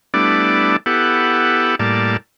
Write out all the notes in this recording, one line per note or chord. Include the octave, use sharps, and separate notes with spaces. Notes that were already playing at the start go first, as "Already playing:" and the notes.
G3 A3 B3 D4 E4 D5
B3 E4 G4 A4 F#5
A2 G3 A#3 D5 A5